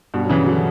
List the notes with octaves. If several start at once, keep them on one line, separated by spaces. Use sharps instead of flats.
G2 B2
F#3
C#3 E3
D3 F#3